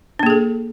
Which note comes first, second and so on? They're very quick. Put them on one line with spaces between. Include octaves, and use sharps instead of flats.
D4 A#3 G#4 A4